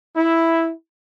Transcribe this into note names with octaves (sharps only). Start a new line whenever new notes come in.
E4